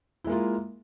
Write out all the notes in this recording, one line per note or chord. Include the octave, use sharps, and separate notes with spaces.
G#3 A#3 E4 F4